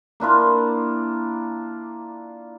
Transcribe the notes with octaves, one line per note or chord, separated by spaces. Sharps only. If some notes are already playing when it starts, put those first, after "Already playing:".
A#3 D4 E4 F4